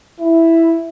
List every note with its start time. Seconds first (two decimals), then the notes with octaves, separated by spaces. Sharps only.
0.20 E4